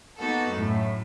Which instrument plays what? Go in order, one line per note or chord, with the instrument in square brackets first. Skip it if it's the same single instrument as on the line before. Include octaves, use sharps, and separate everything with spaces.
[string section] A#3 B3 D#4 F#4 A4
F#2 A2